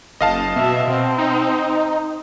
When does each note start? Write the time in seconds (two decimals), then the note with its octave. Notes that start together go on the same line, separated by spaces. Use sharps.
0.21 F#1 D#5 F5 A5
0.56 B2 E5
0.87 B2 C4
1.18 D#4